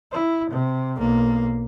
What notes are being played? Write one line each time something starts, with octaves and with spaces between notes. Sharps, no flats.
E4
C3
B1 A#3